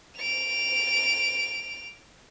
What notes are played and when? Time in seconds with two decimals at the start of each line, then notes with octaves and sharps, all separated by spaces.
0.17 D7 F7